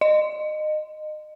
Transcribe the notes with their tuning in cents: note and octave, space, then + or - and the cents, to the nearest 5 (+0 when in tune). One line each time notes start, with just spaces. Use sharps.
D#5 -25